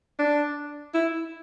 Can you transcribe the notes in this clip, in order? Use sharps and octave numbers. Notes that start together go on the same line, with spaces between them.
D4
E4